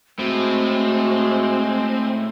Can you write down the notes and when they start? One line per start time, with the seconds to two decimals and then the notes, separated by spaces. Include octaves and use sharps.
0.19 A2 G#3 C4 F#4